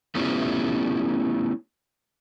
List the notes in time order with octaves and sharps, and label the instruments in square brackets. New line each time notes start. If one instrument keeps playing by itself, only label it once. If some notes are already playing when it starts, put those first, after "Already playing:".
[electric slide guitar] A3 B3 C#4 E4 F4 G4